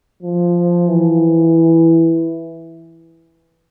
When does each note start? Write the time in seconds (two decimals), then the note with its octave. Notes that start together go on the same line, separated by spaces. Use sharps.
0.23 F3
0.89 E3